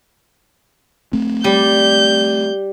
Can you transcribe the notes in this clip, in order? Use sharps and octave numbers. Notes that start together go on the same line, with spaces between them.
A3 C4
G3 G6